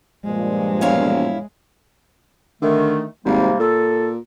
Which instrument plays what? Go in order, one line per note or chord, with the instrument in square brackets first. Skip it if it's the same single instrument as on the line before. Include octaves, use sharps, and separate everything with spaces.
[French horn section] G2 A#2 F3 [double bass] G#3
[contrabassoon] E1 [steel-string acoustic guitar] E4 C#5 F5
[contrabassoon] D3 [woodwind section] D#3 A3
[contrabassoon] G#1 [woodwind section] C3 G3 A#3
[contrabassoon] A#2 [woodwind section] A4